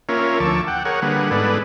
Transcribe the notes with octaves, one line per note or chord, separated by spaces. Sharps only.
A#3 C#4 F4 A#4 C#5 E5
D2 F3 A5 C#6 D6 E6
F#5 G5
G#4 A#4 C#5 F#5
D3 G3 A#3 G#4 B4 F#5
G#2 B3 G#4 A4 B4 D5